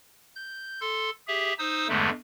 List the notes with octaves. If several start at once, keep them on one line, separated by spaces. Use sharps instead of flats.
G6
A4 C6
G4 G#4 E5
D#4 C5 D#6 E6
E2 G2 D3 G#3 A3